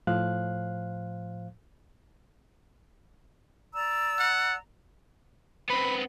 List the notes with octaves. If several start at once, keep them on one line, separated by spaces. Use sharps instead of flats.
A2 F3 C5 F5 F#6
D5 A#5 E6
F#5
B3 C4 B5